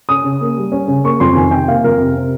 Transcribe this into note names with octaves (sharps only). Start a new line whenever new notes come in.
C#4 D#6
C#3
A#3
G3
C#4
C#3
A#3 C#6
F2 C6
D#3 G#5
C3 G5
A#3 F5
F2 A#4
C3
C3